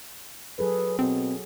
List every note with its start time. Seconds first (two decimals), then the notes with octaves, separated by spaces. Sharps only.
0.59 F#3 G#4 A4 B4
0.99 B2 C4